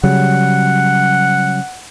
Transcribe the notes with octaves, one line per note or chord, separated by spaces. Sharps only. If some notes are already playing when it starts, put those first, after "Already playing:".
C#3 F#3 G3 F#5